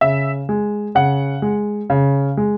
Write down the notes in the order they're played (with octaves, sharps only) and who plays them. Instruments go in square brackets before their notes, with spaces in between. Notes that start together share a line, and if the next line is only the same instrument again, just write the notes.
[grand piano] C#3 E5
G#3
C#3 F#5
G#3
C#3
G#3